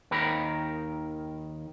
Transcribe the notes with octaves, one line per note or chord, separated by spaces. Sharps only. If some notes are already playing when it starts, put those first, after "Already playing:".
D#2 D#3 A#4 B5